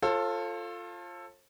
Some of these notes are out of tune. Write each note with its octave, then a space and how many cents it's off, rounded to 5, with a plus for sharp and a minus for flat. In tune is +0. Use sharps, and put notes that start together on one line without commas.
F4 +0 A4 +10 C5 +45